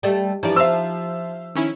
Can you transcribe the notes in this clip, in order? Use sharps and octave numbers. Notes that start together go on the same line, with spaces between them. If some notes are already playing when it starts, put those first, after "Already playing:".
G3 A3 G4 D#5 A5
G2 E3 F3 D#4 G4 D5 A#5
E4 C5 E5 F5 E6
D#3 C#4 E4